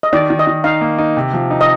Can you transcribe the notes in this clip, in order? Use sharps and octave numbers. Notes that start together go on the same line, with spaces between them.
D#5
D#3 D5
D#3
D#5
D#3
D#4 F5
A#3
D#4
C3
F3
D#4
D#5